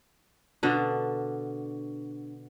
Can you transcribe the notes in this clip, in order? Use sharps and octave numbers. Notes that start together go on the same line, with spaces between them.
B2 D3 D4